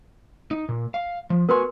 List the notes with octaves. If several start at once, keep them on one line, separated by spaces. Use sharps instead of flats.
D#4
A#2
F5
F3
B3 F#4 A#4 B4 G#5 C6